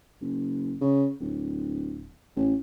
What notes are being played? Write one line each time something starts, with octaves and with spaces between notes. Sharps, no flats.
F#1
C#3
D1
A1